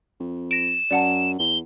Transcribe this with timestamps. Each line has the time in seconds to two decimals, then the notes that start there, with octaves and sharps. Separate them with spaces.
0.20 F2
0.51 A#6 D7 E7
0.91 F#2 D5 F#5 A5
1.39 E2 G7